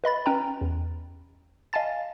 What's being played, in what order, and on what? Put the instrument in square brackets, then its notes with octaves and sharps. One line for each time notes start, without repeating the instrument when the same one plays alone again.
[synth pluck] B4 D#5 B5 A6
C#4 B4 G5 A#5
E2
D#5 F5 G#5 A5 A6